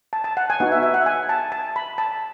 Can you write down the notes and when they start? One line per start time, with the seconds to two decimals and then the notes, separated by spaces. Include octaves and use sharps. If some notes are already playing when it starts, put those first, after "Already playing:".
0.13 A5
0.24 A5
0.37 F#5
0.50 G#5
0.60 B3 D#4 F#4 F#5
0.72 E5
0.83 E5
0.94 F#5
1.06 G#5
1.29 A5
1.52 A5
1.76 B5
1.98 A5